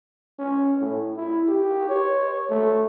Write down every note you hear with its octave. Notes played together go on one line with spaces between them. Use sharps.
C#4
A2
E4
G4
C#5
A3